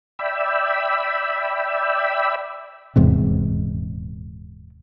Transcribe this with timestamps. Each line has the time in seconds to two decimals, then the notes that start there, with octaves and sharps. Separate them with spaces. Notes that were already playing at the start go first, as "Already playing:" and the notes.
0.19 D5 E5 G5 B5 E6
2.96 D#1 E2 G#2 C3